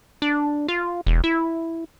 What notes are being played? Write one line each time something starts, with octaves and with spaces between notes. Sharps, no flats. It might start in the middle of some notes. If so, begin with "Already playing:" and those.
D4
F4
E1
E4